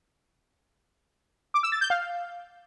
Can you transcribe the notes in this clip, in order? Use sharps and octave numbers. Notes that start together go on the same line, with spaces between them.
D6
E6
A6
G6
F5